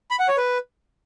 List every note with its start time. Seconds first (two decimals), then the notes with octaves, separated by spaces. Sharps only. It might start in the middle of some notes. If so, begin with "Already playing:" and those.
0.11 B5
0.19 F#5
0.28 C#5
0.37 B4